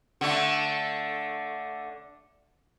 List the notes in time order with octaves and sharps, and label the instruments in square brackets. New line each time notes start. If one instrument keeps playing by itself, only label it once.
[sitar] D3 A3